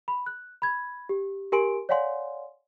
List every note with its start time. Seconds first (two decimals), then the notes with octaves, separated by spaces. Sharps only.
0.08 B5
0.26 F#6
0.62 B5 G#6
1.09 G4
1.52 G4 A#4 G#5 C6 D7
1.89 C#5 D5 F5 F#5 G#5 C6